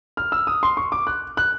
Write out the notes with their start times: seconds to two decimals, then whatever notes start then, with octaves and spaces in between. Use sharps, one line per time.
0.17 F6
0.32 E6
0.47 D#6
0.63 C6
0.77 C#6
0.92 D6
1.07 F#6
1.37 F#6